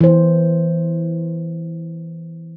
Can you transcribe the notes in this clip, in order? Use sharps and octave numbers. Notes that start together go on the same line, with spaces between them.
E3 C5